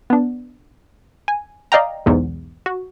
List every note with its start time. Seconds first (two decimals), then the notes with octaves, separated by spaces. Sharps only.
0.10 B3 D4
1.28 G#5
1.72 D5 D#5 F5 G5 A#5
2.06 B1 E2 G#2
2.66 F#4